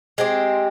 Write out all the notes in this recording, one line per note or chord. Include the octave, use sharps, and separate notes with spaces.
G#3 C4 G4